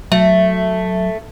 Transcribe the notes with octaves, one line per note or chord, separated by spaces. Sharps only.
F#3 A3 E5